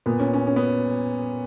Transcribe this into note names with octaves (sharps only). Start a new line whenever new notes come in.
A#2 B3
C#4
C#4
C#4
B3